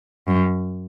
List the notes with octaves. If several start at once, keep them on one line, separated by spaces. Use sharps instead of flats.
F#2